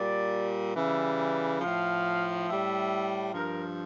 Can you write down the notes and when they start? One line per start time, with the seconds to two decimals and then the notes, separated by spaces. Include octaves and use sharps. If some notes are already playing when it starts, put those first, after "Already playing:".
Already playing: A#2 G3 D5
0.75 C#3 E3 G3 E5
1.61 A2 F3 F5
2.47 A2 G3 E5
3.33 G2 F3 A#4